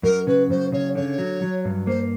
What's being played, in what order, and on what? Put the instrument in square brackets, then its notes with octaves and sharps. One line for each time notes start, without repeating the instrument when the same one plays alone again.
[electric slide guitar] F#2 [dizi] A#4
[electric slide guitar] C#3 [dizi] B4
[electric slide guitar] F#2 [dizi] C5
[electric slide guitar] C#3 [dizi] C#5
[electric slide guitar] D3 [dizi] C#5
[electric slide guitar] F#3
F#3
G2
[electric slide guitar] A#3 [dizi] C5